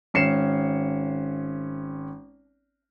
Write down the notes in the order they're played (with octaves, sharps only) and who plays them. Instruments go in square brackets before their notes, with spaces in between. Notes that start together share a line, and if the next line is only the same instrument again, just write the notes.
[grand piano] G#1 C#4 C7 C#7 E7